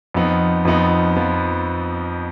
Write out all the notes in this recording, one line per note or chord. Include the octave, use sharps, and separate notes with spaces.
F2 F3 B3 D#4
F2 F3 B3 D#4
F3 B3